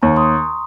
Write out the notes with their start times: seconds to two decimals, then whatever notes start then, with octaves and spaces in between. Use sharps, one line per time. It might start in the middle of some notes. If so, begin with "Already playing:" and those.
0.02 D#2 A#5 C#6
0.16 C6 D#6